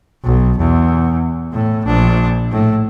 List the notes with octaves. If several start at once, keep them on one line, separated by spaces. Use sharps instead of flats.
B1
E2
A2
A#1 D4
A2